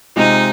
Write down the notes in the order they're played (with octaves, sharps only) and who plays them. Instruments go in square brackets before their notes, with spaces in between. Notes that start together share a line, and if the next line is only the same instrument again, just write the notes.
[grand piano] C3 G#3 F4 [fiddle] D#4